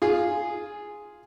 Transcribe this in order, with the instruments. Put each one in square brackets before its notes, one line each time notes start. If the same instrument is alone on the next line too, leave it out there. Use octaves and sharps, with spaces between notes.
[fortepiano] F4 G#4